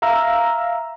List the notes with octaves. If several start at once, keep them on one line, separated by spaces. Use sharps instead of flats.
E5 F5 A#5 E6